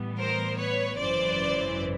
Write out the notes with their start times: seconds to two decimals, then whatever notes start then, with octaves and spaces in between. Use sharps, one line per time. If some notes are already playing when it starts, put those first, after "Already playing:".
Already playing: A2 E3 G3 B3
0.18 A#4 C5
0.58 B4 C#5
0.98 G#1 F#2 C#3 E3 C5 D5